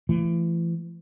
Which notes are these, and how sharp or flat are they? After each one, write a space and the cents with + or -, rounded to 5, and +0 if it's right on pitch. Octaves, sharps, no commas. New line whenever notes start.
E3 +35 A3 +0